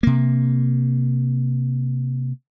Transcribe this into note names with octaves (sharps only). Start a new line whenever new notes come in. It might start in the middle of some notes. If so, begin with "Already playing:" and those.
C3 A#3